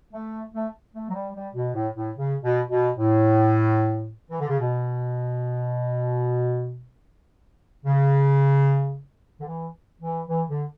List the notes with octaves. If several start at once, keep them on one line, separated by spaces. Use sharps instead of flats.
A3
A3
A3
F#3
G3
G3
B2
A2
A2
C#3
B2
B2
A2
E3
D3
C#3
B2
C#3
D3
E3
E3
E3
D3